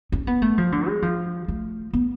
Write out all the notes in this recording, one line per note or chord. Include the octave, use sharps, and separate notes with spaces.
C#4
B3
A3
F3
D3
G#3
F3
A3
B3